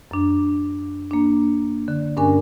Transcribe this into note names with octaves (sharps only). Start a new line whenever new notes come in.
F#2 D4
A#3 D4
D3
G2 C#4 D4 A#4 G#5